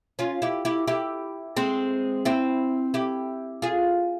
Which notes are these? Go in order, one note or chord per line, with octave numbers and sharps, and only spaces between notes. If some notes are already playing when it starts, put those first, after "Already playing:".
C#4 F4
E4 G4
E4 G4
E4 G4
G#3 C4
C4 E4
E4 G4
F4 G#4